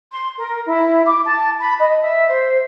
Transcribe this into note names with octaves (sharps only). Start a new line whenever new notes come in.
C6
A#4
E4
D6
A5
B5
D#5
E5
C5